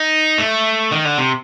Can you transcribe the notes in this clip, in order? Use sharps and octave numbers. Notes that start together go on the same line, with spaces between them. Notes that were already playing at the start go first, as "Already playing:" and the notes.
Already playing: D#4
A3
D#3
D3
C3